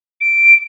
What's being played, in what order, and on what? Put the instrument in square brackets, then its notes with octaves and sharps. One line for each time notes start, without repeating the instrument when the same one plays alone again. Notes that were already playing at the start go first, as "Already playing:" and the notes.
[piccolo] D7